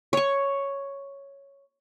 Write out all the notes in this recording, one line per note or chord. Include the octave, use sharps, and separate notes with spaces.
C#5 C#6